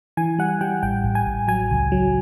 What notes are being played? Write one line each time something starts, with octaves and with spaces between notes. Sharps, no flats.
E3 G#5
G3 F#5
G3 G5
A1 G5
A1
G#5
A1
F#3 G#5
C#2
F#3